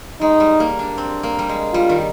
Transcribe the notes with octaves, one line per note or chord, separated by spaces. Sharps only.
G#3 D#4
G3
A#3
D4
C4
A#3
G3
G#3
G3 F4
D#3